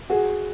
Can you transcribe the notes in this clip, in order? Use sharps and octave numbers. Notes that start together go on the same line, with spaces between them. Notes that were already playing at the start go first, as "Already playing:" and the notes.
F#4 G#4